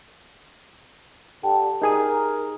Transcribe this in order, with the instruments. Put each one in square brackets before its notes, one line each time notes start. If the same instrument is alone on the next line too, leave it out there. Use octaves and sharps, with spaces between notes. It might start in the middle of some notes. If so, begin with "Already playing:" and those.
[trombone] D3 [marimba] G4 G5 A5
[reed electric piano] D#4 G#4 D#6 [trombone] A#4